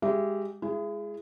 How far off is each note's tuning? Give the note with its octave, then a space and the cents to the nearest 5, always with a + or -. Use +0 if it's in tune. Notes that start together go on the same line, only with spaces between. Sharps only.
G#3 -20 G4 -20 E5 +20
G#3 +0 E4 +40 G#4 +0